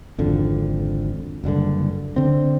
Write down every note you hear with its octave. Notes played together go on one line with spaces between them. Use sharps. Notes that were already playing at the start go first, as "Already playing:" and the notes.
G#1 F2 D3
F#1 G2 A#2 D3
D3 C4